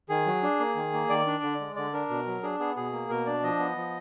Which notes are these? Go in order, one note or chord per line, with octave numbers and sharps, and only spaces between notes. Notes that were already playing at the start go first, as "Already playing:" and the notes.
D#3 G#4
F#3
D4
A#3
D#3
A#3
D#3 D5
D4
D3
G#3
D3 D5
D4 A#4
B2
F#3
D4 G#4
B3 G#4
B2 G#4
A#3
B2 A#4
D4 D5
F3 D#5
B3
F3